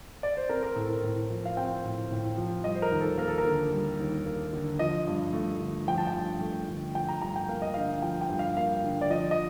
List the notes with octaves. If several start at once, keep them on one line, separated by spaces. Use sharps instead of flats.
D5
C5
C4 A#4
A#4
A2 A4
A#4
A2
F3
F5
C4 G5
A2
A2
F3
G3 D#5
C5
A#4
D#2
A4
A#3 A#4
A4
A#4
D3
G3
D#2
A#3
D3
F3 D#5
G2
A3
D3
F3 G5
A5
G5
G2
A3
D3
F3 G5
A#5
G2 A#5
G5
A#3 F5
D#5
D3 F5
F3 G5
G5
G2
F5
A#3 F5
D3
D5
F3 D#5
D#5